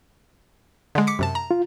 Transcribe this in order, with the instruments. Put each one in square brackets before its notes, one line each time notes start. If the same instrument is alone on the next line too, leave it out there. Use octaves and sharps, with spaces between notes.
[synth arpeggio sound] D3 G#3
D6 B6 C#7
F#2 C3 A5
A#5
[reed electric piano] F4